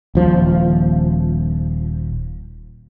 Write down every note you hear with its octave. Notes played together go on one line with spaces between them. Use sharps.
D#1 F3